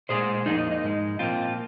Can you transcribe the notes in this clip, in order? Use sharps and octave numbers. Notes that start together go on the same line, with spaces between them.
A#2 G#3 G#4 C5
F2 F3 A#3 D#4 G#4
D#4
D#4
G#2 G#3
A#2 F3 A#3 C4 F4